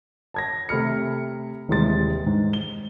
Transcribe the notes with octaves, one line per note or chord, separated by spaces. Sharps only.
A5 G#6 A#6
C3 A3 B5 F6 C#7
D#1 C3 E3 G#3 C6 A6
G#2
G7